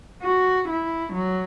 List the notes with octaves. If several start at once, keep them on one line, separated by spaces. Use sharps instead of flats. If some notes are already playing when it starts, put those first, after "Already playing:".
F#4
E4
F#3